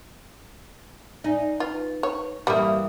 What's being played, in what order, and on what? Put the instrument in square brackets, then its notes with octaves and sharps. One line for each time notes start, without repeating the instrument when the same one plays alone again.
[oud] D#4 [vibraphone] D5 G#5
[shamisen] F4 [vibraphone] B4
[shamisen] C#5
[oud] G2 E3 [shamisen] G3 A#3 [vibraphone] D#6